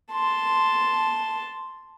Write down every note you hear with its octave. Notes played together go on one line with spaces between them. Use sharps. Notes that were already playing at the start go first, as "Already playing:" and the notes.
A5 C6